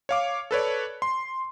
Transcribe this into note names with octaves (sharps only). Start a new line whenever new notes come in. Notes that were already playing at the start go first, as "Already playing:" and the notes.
C#5 F5 D6
A4 B4 C#5 D5
C6